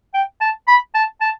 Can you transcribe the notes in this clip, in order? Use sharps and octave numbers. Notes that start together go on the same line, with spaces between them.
G5
A5
B5
A5
A5